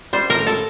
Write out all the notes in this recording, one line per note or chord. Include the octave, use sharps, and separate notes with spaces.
G3 C5
A#4
A2
A4